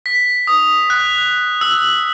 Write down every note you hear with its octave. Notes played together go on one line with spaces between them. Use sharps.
B6
D#6
F#6
E6